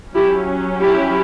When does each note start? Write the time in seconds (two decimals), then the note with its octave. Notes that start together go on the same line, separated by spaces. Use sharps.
0.15 F#3 C#4 E4 G4
0.79 E4 G4